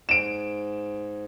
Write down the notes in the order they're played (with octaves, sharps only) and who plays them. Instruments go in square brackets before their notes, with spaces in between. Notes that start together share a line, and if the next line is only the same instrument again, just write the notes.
[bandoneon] G#2 [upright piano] D7 E7